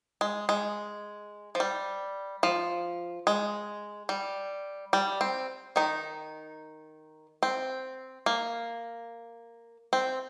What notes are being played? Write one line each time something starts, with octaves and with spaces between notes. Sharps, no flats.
G#3
G#3
F3
G3
F3
G#3
G3
G3
C4
D#3 D#4
C4
A#3
C4